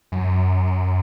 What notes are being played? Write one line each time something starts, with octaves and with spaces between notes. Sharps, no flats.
F#2